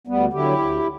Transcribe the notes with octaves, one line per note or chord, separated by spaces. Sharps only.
D2 G3 B3
D3 F#3 E4 G4
D2